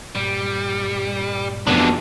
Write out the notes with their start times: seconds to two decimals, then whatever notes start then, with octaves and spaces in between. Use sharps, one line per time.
0.15 G2 A#2 G3
1.67 F1 E2 B2 D4